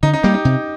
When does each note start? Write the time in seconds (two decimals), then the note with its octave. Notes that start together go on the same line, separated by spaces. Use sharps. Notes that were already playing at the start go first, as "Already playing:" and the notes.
0.03 D3 D#4
0.13 D#4
0.23 G3 A#3 G4
0.34 D#4
0.45 C3